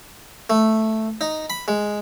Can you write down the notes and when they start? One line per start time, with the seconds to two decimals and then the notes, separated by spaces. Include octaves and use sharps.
0.50 A3
1.21 D#4
1.50 B5
1.68 G#3